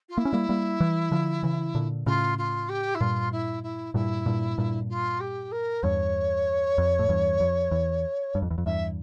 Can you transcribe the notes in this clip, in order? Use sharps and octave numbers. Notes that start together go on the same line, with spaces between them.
F4
A#3 E4
C#4
G3 A#3
G3 A#3
E3 G3
D3 F3
C#3 E3
A#2 D3
A2 C#3 F4
F4
G4
E4
G2 A#2 F4
E4
E4
G2 A#2 E4
G2 A#2
G2 A#2
F4
G4
A#4
E2 G2 C#5
F2
A2
E2 G2
F2
E2
G2
F2
E2
F2
E2 G2 E5